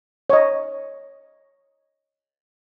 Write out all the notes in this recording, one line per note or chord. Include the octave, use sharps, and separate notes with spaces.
C#5 D#5